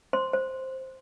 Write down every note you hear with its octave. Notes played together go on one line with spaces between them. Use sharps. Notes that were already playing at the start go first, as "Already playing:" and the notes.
C5 C6
C5